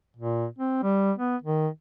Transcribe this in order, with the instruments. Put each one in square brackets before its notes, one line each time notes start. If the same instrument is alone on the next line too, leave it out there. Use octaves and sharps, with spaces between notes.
[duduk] A#2
C4
G3
B3
D#3